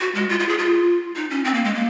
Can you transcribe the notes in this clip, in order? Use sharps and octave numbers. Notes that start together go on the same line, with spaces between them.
F#4
G#3
F4
F4
G#4
F4
D#4
C#4
C4
A#3
G#3
A#3